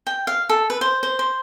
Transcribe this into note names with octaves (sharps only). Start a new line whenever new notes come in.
G5
F5
A4
B4
C5
C5
C5